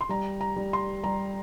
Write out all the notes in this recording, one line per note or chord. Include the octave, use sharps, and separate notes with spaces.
C6
G3 A#5
A#5
G3
C6
G3 A#5